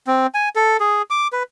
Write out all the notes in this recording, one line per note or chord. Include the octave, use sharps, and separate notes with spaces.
C4
G#5
A4
G#4
D6
B4